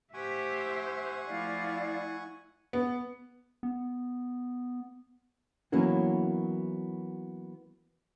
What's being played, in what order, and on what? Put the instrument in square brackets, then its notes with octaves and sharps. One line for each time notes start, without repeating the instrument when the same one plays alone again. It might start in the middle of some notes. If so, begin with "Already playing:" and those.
[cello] A2 G4 [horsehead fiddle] C5 E5 [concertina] F#5 G#5 C#6
[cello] F3 A3 [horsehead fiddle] E4 [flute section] D5 F5
[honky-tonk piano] B3
[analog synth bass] B3
[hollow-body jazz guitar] E3 F#3 A#3 B3 C#4 E4